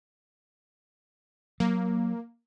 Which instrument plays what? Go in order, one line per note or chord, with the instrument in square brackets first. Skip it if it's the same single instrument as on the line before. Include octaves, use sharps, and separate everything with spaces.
[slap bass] F#3 [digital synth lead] A#3